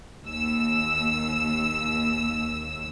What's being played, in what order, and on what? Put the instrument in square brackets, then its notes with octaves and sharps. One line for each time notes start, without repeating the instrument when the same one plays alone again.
[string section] D#2 E6